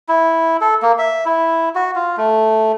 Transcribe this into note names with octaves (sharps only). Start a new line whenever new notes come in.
E4
A4
A#3
E5
E4
F#4
F4
A3